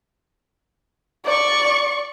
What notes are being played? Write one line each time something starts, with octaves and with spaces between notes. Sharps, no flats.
D5 C#6